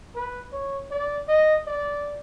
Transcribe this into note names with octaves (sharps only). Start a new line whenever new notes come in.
B4
C#5
D5
D#5
D5